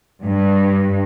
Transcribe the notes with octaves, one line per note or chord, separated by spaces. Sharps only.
G2